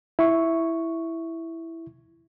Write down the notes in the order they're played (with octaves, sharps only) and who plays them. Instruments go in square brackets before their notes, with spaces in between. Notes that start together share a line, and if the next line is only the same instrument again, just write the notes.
[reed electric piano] E4 C#6